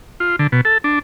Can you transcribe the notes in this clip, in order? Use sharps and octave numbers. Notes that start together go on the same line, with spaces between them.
F4
D3
B2
A4
D4